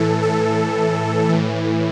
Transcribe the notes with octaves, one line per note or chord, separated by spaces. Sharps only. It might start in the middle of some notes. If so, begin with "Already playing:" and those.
Already playing: A2 E3 A4
A4
A2 E3